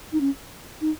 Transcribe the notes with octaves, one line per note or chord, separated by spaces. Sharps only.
D#4
C#4
D#4